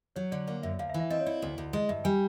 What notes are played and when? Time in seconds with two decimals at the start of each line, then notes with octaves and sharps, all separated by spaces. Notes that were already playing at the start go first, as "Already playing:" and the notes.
0.16 F#3 C#5
0.32 D3 D5
0.47 A#3 D5
0.63 F#2 E5
0.79 D2 F5
0.90 E5
0.94 E3
1.00 E5
1.10 C4 D#5
1.20 C#5
1.26 E4 D5
1.42 D2
1.58 D2
1.73 G#3 D#5
1.89 G2 E5
2.04 G3 G#5